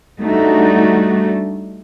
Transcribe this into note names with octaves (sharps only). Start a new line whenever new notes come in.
G3 A3 D4 D#4 F#4